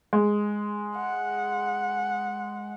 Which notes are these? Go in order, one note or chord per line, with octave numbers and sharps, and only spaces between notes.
G#3
F#5